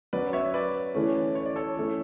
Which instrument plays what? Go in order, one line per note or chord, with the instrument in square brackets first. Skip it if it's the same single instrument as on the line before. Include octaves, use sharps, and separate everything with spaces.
[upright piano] F#3 C#4 F#4 [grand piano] B4 D5
[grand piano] C#5 E5
B4 D5
[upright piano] E3 A3 C#4
[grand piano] C#5
D5
A4 C#5
[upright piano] E3 A3 C#4 E4